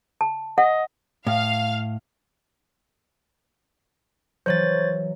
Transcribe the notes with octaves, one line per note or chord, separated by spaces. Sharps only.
A5
D#5 F#5
A2 F5
E3 F#3 C5 C#5 A6